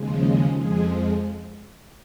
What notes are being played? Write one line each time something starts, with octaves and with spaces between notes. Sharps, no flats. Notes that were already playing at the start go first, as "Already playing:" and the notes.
Already playing: D#2 C#3 F3 G#3
D#5
F2 F3 G#3 G#4